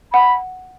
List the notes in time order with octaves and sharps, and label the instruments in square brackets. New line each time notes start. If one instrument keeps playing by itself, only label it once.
[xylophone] F#5 [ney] B5